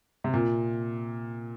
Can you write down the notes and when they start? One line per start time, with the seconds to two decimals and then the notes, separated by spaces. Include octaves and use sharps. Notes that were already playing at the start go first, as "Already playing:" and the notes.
0.24 C3
0.33 A#2